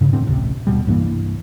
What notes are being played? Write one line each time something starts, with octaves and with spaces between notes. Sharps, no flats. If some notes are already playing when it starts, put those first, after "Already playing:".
G2 C#3
E1 A2 D3 C4
A1 D2 C3
D#2 B2 G3
C2 G2 E3 A#3